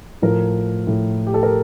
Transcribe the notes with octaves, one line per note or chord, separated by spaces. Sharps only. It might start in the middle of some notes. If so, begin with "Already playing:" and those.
A2 F3 A3 A#4
A2 F3 A3
G4
A4
A#4